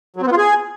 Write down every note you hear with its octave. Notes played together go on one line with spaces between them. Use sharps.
F#3
C4
B3
F4
G#4